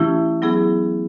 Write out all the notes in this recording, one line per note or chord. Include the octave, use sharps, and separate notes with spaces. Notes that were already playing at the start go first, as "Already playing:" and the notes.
Already playing: E3 A3 C#4 E4 G4
F#3 B3 E4 G#4